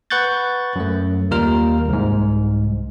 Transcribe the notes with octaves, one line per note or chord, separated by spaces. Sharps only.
B4 F#5 C#6 F#6 G6 A6
F#2 A3
D#2 G3 A#3 F4 A#4 F6
C2 G#2